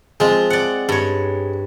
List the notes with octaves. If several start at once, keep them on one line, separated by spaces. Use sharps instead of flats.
F3 G#3 C4
D5 F#5
G2 C#5